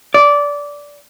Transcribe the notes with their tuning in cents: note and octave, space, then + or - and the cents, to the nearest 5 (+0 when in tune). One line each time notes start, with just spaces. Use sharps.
D5 -15